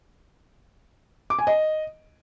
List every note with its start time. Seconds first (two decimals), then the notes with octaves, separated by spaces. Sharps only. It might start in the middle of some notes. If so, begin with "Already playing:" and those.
1.30 D6
1.39 G#5
1.47 D#5